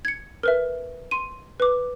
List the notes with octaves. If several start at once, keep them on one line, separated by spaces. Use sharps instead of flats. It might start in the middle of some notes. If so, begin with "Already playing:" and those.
G#6 C#7
A#4 B4 E5
C6 D#7
B4 D6